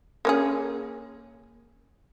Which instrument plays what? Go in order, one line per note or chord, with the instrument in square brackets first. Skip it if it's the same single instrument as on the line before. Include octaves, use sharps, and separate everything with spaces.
[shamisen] A#3 C#4 G#4